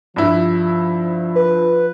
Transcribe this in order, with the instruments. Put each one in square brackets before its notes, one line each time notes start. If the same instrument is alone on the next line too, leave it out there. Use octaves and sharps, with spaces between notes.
[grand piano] G2 E4 [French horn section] F3
[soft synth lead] B4